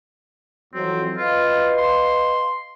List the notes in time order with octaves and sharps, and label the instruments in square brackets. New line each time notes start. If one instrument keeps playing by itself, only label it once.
[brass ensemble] F2 E3 F#3 [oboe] C4
[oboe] F4 [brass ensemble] B4 D#5 F5
[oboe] C6